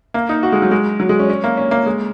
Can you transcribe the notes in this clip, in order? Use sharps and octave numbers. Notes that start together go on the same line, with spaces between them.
A#3
D#4
F#4
G#3
F#3
G#3
F#3
G#3
C#4
C#4
A#3
C#4
A#3
G#3